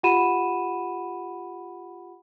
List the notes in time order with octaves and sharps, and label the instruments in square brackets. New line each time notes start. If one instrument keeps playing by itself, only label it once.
[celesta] F4 G4 F#5 B5 D#7 E7